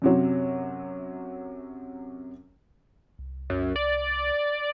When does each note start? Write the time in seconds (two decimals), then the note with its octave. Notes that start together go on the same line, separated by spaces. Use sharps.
0.02 F#2 C3 F#3
3.19 C2
3.50 F#2
3.76 D5